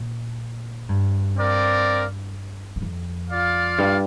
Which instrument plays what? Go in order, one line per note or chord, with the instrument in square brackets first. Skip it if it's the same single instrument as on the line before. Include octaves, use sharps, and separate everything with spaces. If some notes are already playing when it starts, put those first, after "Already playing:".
Already playing: [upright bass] A#2
G2
[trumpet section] C4 A#4 D5 F5
[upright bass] G2
F2
[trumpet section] F4 D5 F5
[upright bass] G2